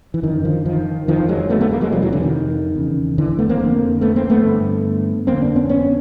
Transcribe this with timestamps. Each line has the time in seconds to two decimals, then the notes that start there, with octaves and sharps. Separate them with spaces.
0.14 E3
0.23 F#2 D3 D#3
0.45 D#3 F3
0.65 D#3 F3
1.08 F2 D3 D#3 F3
1.29 F#3 G#3
1.50 A3 B3
1.61 A3 B3
1.71 G#3 A#3
1.81 F#3 G#3
1.92 F2 C3 F3 G3
2.02 E3 F#3
2.13 D3 E3
2.23 D#3
2.76 E2 C#3
3.18 D3 E3
3.39 A3 B3
3.49 A#3 C4
3.59 F2
3.64 D3
4.01 A3 B3
4.16 A#3 C4
4.30 A3 B3
4.44 G2 D3
5.27 F2 D3 A#3 C4
5.41 C4 D4
5.56 B3 C#4
5.69 B3 C#4